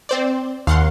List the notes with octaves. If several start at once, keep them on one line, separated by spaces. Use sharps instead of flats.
C4 C5 D5
D#2 F5 F#5 C6